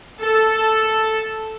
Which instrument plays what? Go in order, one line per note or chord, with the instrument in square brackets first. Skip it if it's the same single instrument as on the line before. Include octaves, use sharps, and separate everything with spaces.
[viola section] A4